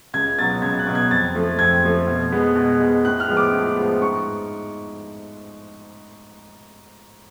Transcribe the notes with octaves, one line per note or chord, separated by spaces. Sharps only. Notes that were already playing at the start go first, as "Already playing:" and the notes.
C#2 G#6
B2 F#3 B3 A6
C#2 G#6
F#6
B2 F#3 B3
G#6
F2 A6
F3 A3
F2 G#6
F3 A3
B2
G#3 B3
B2
G#3 B3
A2 F#6
F6
F3 G#3 B3
D6
A2
F3 G#3 B3
G#2 C#6